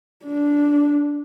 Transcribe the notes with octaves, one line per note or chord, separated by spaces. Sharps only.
D4